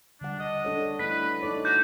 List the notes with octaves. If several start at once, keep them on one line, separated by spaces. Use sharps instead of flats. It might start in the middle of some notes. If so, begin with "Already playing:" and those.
D3 G3 D4 F#5
D#5
D4 A4 C#5
A3 D4 E4 B4 B6
D#4 A4 C#5 D5
F#4 G6